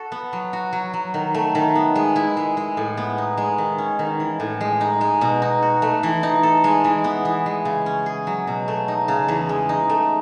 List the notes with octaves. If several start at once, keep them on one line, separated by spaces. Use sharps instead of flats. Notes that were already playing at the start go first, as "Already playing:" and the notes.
Already playing: F#4 A4
B3
F#3
F#4
F#3
F#3
D#3
A3
D#3
B3
G#3
E4
G#3
G#3
A2
B3
D#4
G#3
D#3
C#4
D#3
E3
A2
G#3
D#4
G#3
B2
D#4
F#4
A3
E3
D#4
A4
G#3
E3
B3
E3
G#3
C#3
C#4
G#4
F#3
B2
A3
D#4
C#3
E2
G#3
D#4
A3